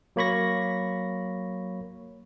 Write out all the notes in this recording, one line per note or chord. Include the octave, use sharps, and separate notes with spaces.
F#3 A#3 C#5 B5 C#6 A#6